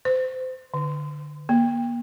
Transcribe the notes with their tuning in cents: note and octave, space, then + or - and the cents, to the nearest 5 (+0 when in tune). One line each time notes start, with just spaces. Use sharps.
C5 -25
D3 +20
A#3 +35